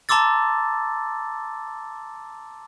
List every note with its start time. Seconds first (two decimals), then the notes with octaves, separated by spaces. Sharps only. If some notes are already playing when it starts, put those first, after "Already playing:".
0.09 A5 A#5 C6 D6 E6 A6